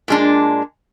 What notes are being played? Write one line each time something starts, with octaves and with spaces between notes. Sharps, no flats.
A#2 G#3 D4